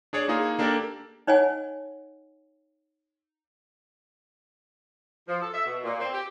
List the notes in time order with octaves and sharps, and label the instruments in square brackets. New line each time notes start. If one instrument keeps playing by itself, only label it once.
[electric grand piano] D4 G#4 C#5 D5
A#3 D#4 F4 G#4
A#3 D4 G4 A4 A#4 D5
[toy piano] D#4 C#5 D#5 F#5 G#5
[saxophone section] F3
A4
E5
B2
A#2
C4
G4